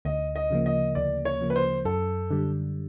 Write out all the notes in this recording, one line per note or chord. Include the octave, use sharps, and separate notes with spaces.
D2 D#5
D#5
C#3 F3 A#3
D#5
D2 D5
C#5
C#3 F3 A#3
B4
C5
F#2 A4
D3 G3